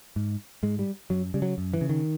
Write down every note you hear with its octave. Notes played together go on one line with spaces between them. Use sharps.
G#2
G#2 G#3
G3
F#2 F#3
C#3 G3
F#3
F#2
E3
C#3
D#3